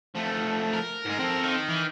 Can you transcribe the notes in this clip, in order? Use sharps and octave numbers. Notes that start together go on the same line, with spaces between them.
F3 A3
A#4
G#2 G#3
C4 A4
D#3
E3